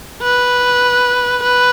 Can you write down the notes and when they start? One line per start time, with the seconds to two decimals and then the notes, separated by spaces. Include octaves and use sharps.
0.22 B4
1.42 B4